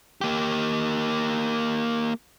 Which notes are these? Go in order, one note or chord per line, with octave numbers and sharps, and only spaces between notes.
A#3 G4